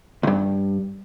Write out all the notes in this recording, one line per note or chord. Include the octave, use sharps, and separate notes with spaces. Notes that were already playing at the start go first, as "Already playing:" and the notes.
C#2 G2